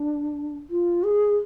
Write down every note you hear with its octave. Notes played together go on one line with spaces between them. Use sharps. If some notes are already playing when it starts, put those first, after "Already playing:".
Already playing: D4
F4
G#4